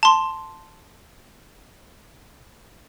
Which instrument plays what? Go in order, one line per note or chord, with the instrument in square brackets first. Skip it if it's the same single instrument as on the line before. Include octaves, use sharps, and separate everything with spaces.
[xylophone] A5 C6